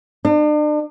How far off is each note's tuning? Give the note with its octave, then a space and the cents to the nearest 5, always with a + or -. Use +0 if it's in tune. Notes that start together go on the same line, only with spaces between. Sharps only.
D4 +40